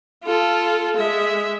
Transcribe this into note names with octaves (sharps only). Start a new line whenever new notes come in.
F4 A4
G#3 E5